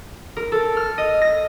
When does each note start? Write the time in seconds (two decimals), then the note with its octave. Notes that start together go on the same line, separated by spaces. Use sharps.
0.37 A#4
0.52 A4
0.77 F6
0.98 D#5
1.22 A#6